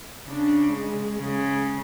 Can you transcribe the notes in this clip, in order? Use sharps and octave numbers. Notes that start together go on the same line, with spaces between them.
C#3 D4
G#3
C#3 G#3